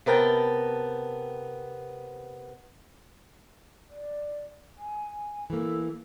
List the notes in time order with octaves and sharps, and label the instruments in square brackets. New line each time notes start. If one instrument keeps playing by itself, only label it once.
[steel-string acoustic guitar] C3 B3 A#4 G5 A5
[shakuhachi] D5
G#5
[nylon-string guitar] E3 A#3 [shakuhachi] A4